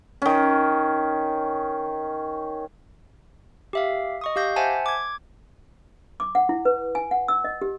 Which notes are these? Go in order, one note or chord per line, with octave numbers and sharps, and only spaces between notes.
D#3 C#4
G4 E5 F5
D#5 C#6 D#6
G4 F5 G6 A#6
C5 E5 F#5 G#5 A5
D6 G#6
D6
F#5
E4
B4
G#5
F#5
E6
D#5
G4